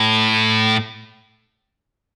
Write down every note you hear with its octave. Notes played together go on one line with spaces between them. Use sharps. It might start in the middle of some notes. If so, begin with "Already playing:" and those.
Already playing: A2